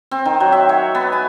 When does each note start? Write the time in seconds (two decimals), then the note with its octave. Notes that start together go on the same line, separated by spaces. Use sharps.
0.11 C4
0.25 D#3
0.40 F#3
0.52 E5
0.69 C#5
0.95 B3
1.12 G#5